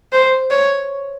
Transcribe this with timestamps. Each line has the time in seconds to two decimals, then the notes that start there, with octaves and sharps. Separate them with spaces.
0.13 C5
0.51 C#5